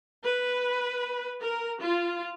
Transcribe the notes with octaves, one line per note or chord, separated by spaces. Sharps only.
B4
A#4
F4